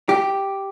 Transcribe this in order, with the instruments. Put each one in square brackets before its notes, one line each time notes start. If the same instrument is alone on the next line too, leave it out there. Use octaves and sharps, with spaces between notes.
[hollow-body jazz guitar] G4